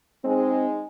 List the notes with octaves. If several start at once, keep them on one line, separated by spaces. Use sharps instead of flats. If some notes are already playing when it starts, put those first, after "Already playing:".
G#3 C4 D#4